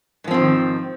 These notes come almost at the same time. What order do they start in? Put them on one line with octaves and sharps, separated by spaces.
G#2 F3 C4 D#3